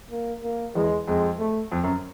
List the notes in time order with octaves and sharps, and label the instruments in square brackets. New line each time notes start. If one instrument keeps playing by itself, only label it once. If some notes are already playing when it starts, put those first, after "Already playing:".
[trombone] A#3
A#3
[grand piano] E2 [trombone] G#3
[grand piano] F2 [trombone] G#3
[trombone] A3
[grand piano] F2
F#2